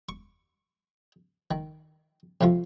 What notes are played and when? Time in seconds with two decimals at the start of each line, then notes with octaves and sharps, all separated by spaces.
0.09 C#6
1.51 D#3
2.41 F2 C3 F3 F4